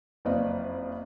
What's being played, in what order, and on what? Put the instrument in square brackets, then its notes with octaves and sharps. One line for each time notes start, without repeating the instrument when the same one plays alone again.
[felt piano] F#1 F2 B4 D5 D#5 F5